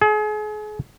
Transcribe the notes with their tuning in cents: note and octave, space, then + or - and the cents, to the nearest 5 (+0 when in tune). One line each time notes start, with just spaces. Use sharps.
G#4 +35